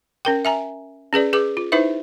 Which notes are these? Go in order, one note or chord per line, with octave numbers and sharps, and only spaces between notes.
C#4 A#4 G5
E5 G#5 A#5
C#4 G#4 B4 D5
G#4 B4 D6
F4
D#4 E4 B4 C5 E5